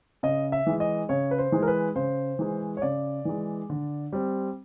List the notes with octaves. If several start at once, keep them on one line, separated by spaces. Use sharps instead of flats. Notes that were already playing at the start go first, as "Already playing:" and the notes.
C#3 D#5
E5
E3 G#3
D#5
C#3 C#5
B4
C5
E3 G#3
A#4
B4
C#3 C5
E3 G#3
C#5
C#3 D5
E3 G#3
D3
G3 C4